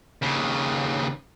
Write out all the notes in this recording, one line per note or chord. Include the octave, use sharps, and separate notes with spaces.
D#2 C#3